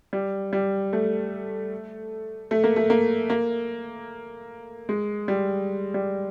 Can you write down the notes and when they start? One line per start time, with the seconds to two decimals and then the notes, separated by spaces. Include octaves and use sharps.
0.13 G3
0.53 G3
0.93 A3
2.51 A3
2.64 A#3
2.76 A3
2.90 A#3
3.30 A#3
4.89 G#3
5.28 G3
5.94 G3